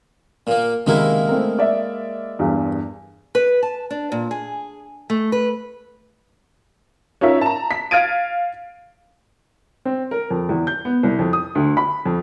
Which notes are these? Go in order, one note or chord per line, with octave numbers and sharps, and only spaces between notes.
A#2 A#3
C#2 C3 D#3 G#3 A#3 E4
A3 C4 A#4
D5 E5
E2 G2
B4
A5
D4
A#2
G#4
A3
B4
C#4 D#4 F4 A#4 E5
A5 A#5
B6
F5 F6 G#6 A6 D7 D#7
C4
A#4
F2
E2
G6
B3
C2
F2
D#6
D2
B5
F2